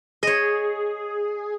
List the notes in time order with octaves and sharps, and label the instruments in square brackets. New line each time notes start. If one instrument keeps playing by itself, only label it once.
[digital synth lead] G#4 [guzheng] C#5 D#5